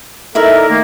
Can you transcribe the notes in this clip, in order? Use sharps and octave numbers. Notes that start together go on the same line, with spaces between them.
D#4 E4 A4 A#4 D5 E5
D#3 A3 A#3